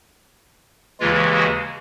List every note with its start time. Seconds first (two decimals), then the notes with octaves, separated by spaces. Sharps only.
1.00 D#2 C#3 E3 G#3 F4
1.34 F#4